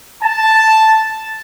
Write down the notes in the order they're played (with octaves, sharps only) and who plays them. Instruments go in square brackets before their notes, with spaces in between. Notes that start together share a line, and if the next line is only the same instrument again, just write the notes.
[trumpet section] A5